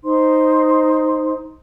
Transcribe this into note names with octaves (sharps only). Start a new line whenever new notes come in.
D#4 C5 C6